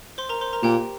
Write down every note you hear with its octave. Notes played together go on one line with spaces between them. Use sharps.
C5 C6
A#4 A#5
C5 C6
A#4 A#5
A#2 G4 G5